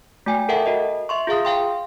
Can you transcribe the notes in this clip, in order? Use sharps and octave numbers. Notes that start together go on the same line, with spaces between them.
A3 F#4 G5 G#5
A4 A#4 E5 F#5 G5 A5
F#4 A#4 D#5
E5 C6 C#6
F4 G#4 F5 D#6
F5 G5 C6